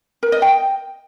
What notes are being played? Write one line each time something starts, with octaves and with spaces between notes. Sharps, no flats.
A#4
D#5
G5